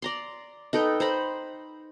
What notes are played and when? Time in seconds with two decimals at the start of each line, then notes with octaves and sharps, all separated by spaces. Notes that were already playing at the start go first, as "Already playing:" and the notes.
0.02 D5 A#5 C6
0.73 D#4 A4 B4 G5
1.00 C5 A#5 B5